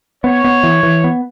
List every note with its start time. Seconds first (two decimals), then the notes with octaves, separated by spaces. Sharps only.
0.24 B3 C#5
0.44 B3
0.63 E3
0.83 E3
1.04 B3